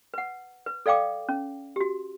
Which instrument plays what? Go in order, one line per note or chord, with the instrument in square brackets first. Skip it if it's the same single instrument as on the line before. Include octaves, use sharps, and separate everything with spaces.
[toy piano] B4 F#5
B4
A4 D5 F5 G5 D6
C#4
F#4 G4